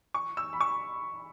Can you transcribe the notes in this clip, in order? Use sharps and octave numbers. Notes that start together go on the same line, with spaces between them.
C#6
E6
B5
C#6